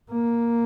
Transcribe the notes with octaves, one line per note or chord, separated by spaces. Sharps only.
A#3